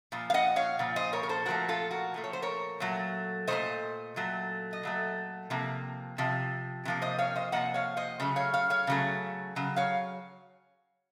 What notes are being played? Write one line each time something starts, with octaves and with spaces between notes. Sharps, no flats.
A#2 F3
F5
D#5 F#5
C#5 F5
A#2 F3
C5 D#5
A#4 C#5
A#4
A4 C5
A#2 F3 A3 F#4 A#4
F4 A4
F#4 A#4
A#2 F3 A3
C#5
C5
A#4 C#5
A#2 F#3 A3
A#2 F#3 A3 C5 D#5
A#2 F#3 A3
D#5
A#2 F#3 A3
C3 F3 A#3
C3 F3
C3 F3 A#3
C5 D#5
C#5 F5
C5 D#5
C3 F3 A#3 D#5 F#5
C#5 F5
C5 D#5
C#3 F#3 A3
C#5 F5
C#5 F5
C#5 F5
C#3 F#3 A3
C#3 F#3
C#5 F5